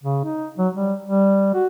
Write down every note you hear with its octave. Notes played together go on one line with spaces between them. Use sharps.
C#3
D#4
F#3
G3
G3
F#4